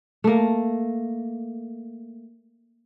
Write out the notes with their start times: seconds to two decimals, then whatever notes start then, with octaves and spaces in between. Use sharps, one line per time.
0.24 A3 A#3